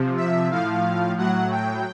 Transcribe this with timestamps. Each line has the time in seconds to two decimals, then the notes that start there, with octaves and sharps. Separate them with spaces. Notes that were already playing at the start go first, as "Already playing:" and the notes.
Already playing: C3 F3
0.17 E5
0.50 A2 F3 F5
1.17 A2 F#3 F#5
1.51 G5